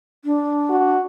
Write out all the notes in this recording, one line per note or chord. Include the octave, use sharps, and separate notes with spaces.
D4
F#4